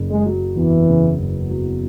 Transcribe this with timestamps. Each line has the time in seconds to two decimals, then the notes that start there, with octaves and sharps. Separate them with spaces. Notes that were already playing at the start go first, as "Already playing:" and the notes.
Already playing: F#1 C#3
0.10 G#3
0.26 F#3
0.56 E2 E3
0.88 C#3
1.19 F#1
1.50 F#3